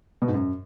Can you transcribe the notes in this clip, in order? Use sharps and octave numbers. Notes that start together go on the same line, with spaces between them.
B2
G#2
F#2